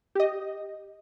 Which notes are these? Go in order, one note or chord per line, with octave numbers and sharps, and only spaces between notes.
G4 D#5